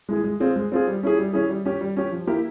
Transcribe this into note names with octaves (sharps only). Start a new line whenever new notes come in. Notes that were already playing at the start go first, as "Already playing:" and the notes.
G#3 E4 G#4
G#3
C4 F4 G#4
G#3
C4 F4 G#4
G3
C#4 E4 G#4
G3
C#4 E4 G#4
G3
C#4 G4
G3
C#4 G4
F3
A#3 E4 G4